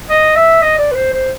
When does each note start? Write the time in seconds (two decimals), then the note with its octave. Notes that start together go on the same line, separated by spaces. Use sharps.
0.10 D#5
0.35 E5
0.62 D#5
0.78 D5
0.91 B4
0.95 C5
1.13 C5